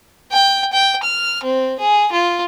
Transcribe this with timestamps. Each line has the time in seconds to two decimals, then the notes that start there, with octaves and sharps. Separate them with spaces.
0.32 G5
0.73 G5
1.04 F6
1.44 C4
1.79 G#4
2.12 F4